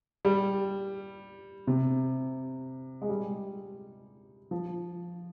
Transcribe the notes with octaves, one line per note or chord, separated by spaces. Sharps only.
G3
C3
G#3
G3
F3